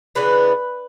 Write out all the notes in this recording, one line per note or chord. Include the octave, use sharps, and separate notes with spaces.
C#3 E3 B3 D4 B4